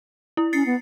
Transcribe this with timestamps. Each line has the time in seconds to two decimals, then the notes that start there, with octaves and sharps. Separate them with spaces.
0.37 E4
0.53 C#4 A6 C7 C#7
0.65 B3